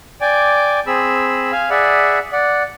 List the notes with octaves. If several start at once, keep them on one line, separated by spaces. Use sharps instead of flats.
D5 G5 G#5 D6
C4 G#4 B5 E6
F5 G#5
G#4 D5 E5 F#5 B5
D5 F#5